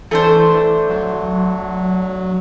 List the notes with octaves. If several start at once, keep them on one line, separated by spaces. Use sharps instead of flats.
E3 A3 D4 C5
F#3